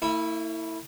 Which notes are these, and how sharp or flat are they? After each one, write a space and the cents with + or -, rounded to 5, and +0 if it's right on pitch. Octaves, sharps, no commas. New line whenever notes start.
A3 +45 E4 -15